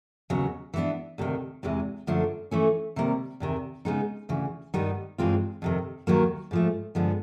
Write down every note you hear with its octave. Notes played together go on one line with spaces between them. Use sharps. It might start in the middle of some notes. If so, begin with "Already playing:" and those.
D#2 C#3 F#3 B3
E3 G3 B3 D4
D2 C3 D#3
E2 C3 E3 G#3
F#2 D3 F3 A3 D4
E3 A3 C#4
C3 D#3 G3 A#3
E2 C3 D#3
C#3 E3 G#3 B3 D#4
D2 C#3 E3
G2 D#3 G3 B3 D#4
G2 E3 G#3 C4 F4
F2 C3 D#3
D#2 D#3 F#3 A#3
G#2 F3 A3
G2 D3 F3 G#3 B3